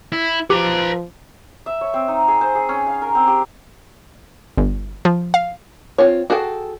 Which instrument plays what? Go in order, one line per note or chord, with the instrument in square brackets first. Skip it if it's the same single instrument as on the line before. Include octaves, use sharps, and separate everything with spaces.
[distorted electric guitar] E4
[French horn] F3 [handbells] G4 [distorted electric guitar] B4 A#5
[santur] E5
C#5
C4
D#4
G#4
C5
G#4
C#4
F5
A#4
C4
G4
[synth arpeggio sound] G1
F3
F5
[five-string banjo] C4 F4 C#5
F#4 G#4 A4 G5